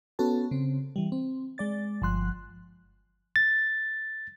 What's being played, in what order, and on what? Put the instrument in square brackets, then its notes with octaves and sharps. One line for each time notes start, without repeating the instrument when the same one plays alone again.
[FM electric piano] B3 C#4 F#4 A4 A5
C#3 C4
E3 G3
C4
G#3 D5 A6
G1 F3 C6 F#6
[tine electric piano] A6